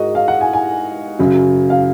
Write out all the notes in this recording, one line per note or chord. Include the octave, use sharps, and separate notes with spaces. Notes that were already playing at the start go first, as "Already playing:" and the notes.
Already playing: G#2 F#4 G#4 A#4 D#5
F5
F#5
G#5
G#5
F#2 C#3 F#3
F5